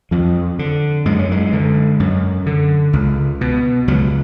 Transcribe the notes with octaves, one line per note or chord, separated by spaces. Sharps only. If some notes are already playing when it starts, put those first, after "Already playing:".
F2 F3
D3
F#2 G#3
F#3
G#3
D3
F#2
D3
C#2
B2
C#2 F#3